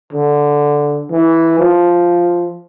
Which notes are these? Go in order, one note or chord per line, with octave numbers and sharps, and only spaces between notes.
D3
E3
F3